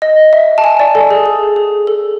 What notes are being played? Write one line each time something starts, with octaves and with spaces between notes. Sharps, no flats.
D#5
E5
A5
G#5
D5
A4
G#4
G#4
G#4
A4